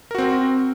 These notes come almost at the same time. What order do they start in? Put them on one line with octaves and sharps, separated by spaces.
A#4 F#4 C4